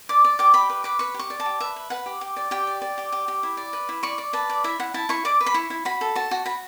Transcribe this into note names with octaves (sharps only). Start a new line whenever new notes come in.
D5 D6
D5
G4 D6
G4 B5
B4
B4 D6
B4 C#6
G4
C#6
D5
A5
G4
B4 E5
B4
B4 F#5
G4
G4
D5
G4 G5
D5
D5
G4
G4
G4
E4
D5
B4
E4
D5 C#6
D5
B4 A5
D5
E4 E5
E4 F#5
E4 A5
E4 C#6
D5 D6
B4
B5
E4 C#6
E4
F#4 B5
A4
F#4 A5
F#4
F#4 B5